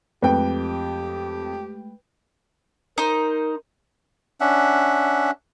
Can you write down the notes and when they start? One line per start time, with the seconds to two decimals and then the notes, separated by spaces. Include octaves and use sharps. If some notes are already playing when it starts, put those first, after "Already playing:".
0.22 F2 G#3 A3 G4 B4 G5
2.98 D#4 A#4 C5
4.41 C#4 D4 E5 F#5